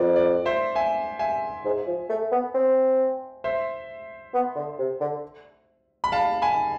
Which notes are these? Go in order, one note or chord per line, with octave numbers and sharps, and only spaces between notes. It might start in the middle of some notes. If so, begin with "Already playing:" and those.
Already playing: F2 D5
D5
C5 E5
E5 G#5
E5 G#5
G#2
F3
A3
B3
C4
C5 E5
B3
D3
C3
D3
B5
F5 A5
G#5 B5